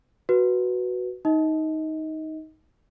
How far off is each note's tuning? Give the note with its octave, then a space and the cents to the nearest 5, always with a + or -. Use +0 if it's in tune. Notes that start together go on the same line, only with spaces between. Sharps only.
F#4 +0 B4 -10
D#4 +10 D#5 +30